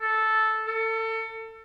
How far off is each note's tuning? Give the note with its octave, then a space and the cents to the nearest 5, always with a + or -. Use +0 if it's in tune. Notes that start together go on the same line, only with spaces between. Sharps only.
A4 -10
A4 +30